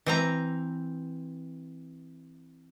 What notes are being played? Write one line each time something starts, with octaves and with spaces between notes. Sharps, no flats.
E3 C4 A#5